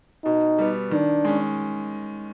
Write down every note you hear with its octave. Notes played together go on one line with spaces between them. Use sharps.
B2 D#4
G3 B3
D#3 D4
G#3 C#4